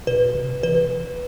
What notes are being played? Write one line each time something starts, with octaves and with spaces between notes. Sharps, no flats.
B2 B4
B2
C3
E3 B4